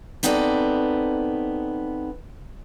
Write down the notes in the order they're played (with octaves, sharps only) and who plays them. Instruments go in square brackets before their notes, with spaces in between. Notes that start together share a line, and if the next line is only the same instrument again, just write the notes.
[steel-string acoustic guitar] B3 C4 D#4 A4 D5